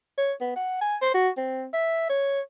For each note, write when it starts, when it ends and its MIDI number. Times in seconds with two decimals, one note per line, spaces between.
0.18 0.32 73
0.41 0.53 59
0.56 0.80 78
0.81 0.96 80
1.02 1.12 72
1.14 1.29 66
1.37 1.65 60
1.73 2.09 76
2.09 2.41 73